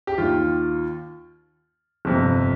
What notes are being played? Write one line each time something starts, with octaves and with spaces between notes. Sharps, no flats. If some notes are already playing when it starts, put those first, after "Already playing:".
G4
D#2 D#3 F4
G1 F2 C3